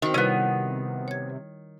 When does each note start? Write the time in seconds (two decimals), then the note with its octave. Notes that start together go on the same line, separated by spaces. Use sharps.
0.02 D#3 C4 F#4 C5
0.14 C3 G3 B3 C#4 E4 C#5
1.08 C#5 G#6